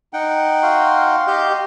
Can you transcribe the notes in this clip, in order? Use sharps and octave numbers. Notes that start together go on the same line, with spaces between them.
D#4 F#5 G5
F#4 F5 C6
G4 D#5 G6